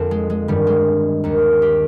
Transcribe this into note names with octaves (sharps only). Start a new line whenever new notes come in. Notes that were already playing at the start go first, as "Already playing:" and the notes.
Already playing: F2 D3 A#3 C4
G#3
G#3
G2 D#3 G3
G#3
D#2 D#3
G4